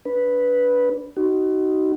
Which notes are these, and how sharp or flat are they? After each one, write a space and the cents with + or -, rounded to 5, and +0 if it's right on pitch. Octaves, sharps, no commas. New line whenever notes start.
D4 -30 B4 -5
D#4 +0 F#4 +30